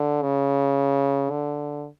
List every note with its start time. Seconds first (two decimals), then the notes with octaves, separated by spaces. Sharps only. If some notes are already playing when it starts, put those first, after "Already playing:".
Already playing: D3
0.22 C#3
1.30 D3